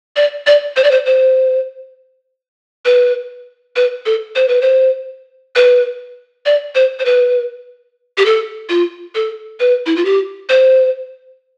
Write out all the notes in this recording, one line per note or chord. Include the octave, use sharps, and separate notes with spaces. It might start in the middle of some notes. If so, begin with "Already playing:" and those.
D5
D5
C5
D5
C5
C5
B4
B4
A4
C5
B4
C5
B4
D5
C5
C5
B4
G4
A4
F4
A4
B4
E4
F4
G4
C5